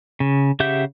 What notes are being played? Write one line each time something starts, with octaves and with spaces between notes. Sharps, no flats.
C#3
C#3 G4 E5 F#5 G6